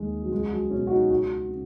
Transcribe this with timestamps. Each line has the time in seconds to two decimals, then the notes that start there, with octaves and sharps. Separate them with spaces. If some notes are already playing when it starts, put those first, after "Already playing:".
Already playing: D#2 D#3 G#3
0.23 F#3
0.31 C#2 G#3
0.51 F#3
0.70 B2 C#4
0.87 F#4
0.90 D#4
1.10 C#2 F#4
1.49 C#3